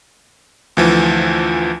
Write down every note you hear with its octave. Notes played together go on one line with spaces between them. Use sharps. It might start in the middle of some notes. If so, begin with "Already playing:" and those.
D2 E3 F3